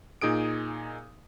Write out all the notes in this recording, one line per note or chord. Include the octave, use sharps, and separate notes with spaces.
A#2 D#4 G#4 D#6 D7